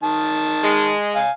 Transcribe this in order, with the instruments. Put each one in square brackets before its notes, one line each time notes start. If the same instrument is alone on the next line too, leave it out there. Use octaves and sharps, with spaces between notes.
[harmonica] D#3 A5
[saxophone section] G#3
[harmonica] F5 G#5